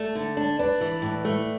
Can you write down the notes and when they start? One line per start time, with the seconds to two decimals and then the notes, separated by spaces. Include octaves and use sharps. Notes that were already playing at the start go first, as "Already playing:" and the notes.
Already playing: A3 D5
0.15 D3
0.37 D4
0.59 D4 B4 D5
0.81 E3
1.02 A2
1.25 A3